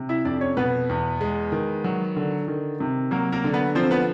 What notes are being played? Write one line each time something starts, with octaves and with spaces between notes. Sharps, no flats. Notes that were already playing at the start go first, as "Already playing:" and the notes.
Already playing: C3
E4 E5
F2 D4 D5
C#4 C#5
B2 B3 B4
E2
G#3
D#3
F#3
D3
D#3
C3
F#3 A#3 A#4
A#3 A#4
D3
B3 B4
F3 C4 C5
B3 B4